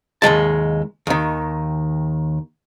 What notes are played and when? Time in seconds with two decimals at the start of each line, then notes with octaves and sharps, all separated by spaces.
0.22 D#2 F#3 G#3 A5
1.07 D#2 D#3